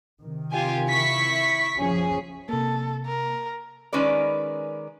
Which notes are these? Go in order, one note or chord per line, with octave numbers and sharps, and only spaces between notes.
C3 D#3
F4 G4 G#5
E4 C#6 B6
F#1 F3 C#4 G#4
C3 A#3 A4
A#4
D#3 G#3 C#4 A#4 B4 D5